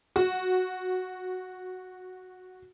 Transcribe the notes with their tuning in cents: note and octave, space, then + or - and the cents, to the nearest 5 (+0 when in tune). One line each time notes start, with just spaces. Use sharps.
F#4 -5